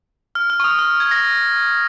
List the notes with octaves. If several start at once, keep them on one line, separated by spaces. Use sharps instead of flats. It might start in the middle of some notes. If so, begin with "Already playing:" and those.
F6
F6
C#6
D#6
F6
G#6
A#6